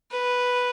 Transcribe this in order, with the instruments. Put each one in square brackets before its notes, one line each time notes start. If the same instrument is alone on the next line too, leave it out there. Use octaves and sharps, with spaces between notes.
[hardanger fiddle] B4